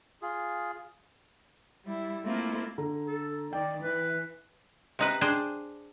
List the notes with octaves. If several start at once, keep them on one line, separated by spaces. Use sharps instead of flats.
F4 G#4
G3 E4
A3 A#3 C4 E4 F4
D3 A#5
A4
D#3 D5 G5
E3 B4
C3 D#4 B4
D4 G#4 C5 G5